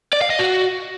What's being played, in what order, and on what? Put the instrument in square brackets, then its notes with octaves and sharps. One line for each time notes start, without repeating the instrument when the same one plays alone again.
[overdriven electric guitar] D5
F5
D#5
F#4